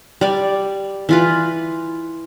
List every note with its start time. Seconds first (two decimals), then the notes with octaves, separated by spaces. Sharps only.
0.21 G3 D5
1.09 E3 F4 B4